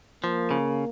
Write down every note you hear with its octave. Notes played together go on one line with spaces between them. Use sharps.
F3 A#3
C#3